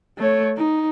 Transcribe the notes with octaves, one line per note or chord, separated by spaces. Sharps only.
A3 C#5
D#4